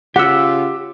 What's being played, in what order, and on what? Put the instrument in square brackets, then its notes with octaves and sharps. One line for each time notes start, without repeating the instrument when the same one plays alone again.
[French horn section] C#3 F4 [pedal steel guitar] G4 E6 [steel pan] F#5